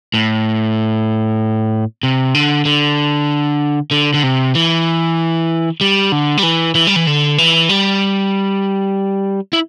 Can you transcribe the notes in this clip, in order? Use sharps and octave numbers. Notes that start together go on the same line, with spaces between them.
A2
C3
D3
D3
D3
D3
C3
E3
G3
D3
G3
E3
E3
G3
E3
D3
E3
G3
E4